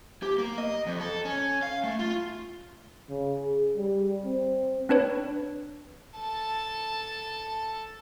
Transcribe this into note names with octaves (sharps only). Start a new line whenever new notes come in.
G4
A#3
D#5
F2
A4
C#4
F5
A3
F4
C#3
G#4
G3
C4
C4 D4 B4 C#5
A4 A5